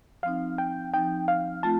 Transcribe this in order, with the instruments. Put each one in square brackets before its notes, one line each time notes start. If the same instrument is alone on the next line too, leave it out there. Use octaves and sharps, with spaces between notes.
[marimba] F3 C4 D#4 [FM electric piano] F5
[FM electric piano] G5
[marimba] F3 C4 D#4 [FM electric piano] G5
[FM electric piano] F5
[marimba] A3 C4 F4 [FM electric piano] A5